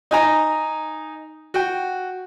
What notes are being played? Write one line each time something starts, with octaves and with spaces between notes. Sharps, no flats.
D#4 G#5 A#5
F#4 G5